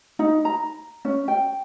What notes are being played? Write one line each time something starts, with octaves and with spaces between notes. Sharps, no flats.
D#4
A#5
C#4
G5